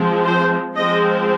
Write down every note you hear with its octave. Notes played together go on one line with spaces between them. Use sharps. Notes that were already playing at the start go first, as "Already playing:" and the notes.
Already playing: F3 G#3 C4
C5
F3 G#3 C4 D#5